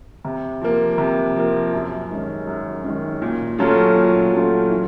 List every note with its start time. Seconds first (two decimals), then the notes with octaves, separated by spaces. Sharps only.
0.25 C3
0.61 F3 A#3
0.98 C3
1.36 F3 A#3
1.73 F#2
2.10 D#3 G#3 C#4
2.47 F#2
2.84 D#3 G#3 C#4
3.22 A#2
3.58 F#3 A3 C#4 F4
3.96 A#2
4.33 F#3 A3 C#4 F4
4.70 E3